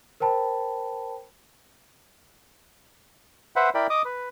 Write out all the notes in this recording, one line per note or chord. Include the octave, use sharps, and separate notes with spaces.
A#4 C5 G5 A5 B5
B4 C5 E5 F#5
E4 A#4 D5 G5 B5
D#5 D6 D#6
B4